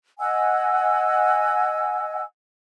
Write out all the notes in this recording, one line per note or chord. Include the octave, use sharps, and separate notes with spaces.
D#5 F#5 G#5 E6